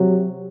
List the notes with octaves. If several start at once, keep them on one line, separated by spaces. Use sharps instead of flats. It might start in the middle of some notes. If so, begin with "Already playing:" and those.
Already playing: C3 F#3